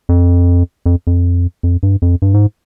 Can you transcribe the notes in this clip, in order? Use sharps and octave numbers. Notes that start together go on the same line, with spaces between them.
F2
F2
F2
F2
G2
F2
G2
G#2